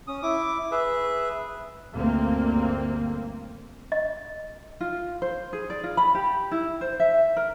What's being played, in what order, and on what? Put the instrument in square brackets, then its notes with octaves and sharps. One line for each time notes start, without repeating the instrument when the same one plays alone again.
[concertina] C#4 D#6
E4 D6
G#4 B4 E5
[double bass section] G1 D2 A#3 C4
[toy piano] D#5
[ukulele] F4
C5
G#4
D5
F4
B5
G4
E4
C5
E5
A#4